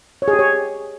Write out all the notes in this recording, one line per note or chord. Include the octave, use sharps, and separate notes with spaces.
C#5
G#4
G4
C#5